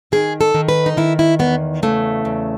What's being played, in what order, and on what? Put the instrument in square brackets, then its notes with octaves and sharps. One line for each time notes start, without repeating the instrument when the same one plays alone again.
[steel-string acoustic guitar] D#3 G#4
A4
D#3
B4
D#4
D#3 E4
E4
E2 B3
C#3 A3
E2